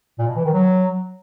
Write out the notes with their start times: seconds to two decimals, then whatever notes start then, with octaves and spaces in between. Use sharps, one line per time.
0.19 A#2
0.27 B2
0.36 E3
0.45 D#3
0.53 F#3